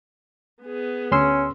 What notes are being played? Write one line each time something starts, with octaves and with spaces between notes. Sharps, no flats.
B3 G#4
D2 C#4 C6 E6